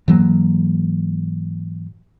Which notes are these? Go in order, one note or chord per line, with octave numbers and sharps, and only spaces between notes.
G#2 E3 F#3 A#3